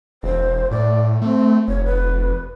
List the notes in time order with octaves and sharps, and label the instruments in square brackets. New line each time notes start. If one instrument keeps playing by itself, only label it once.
[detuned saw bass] E1 [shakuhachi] C5
[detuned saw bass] A2 [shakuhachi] D5
[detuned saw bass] A3 [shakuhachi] C4
[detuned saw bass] F1 [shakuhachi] C#5
[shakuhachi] B4